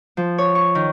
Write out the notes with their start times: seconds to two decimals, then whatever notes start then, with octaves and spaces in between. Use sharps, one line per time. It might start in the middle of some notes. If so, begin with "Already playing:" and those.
0.17 F3
0.38 C#5
0.55 C#6
0.75 D#3